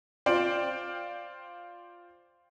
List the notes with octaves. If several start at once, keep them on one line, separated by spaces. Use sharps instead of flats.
F4 C5 D5 G5